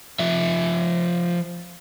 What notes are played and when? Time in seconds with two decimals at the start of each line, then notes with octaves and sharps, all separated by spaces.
0.19 F3 E5